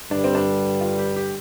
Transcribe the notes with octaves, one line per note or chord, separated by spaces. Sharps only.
G2 D3 G3 D4
C4
D4
F4
G4
G4